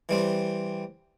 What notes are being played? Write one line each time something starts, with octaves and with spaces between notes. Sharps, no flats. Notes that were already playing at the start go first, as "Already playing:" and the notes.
E3 G3 C4